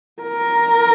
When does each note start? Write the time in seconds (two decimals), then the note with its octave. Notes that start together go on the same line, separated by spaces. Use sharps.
0.22 A#4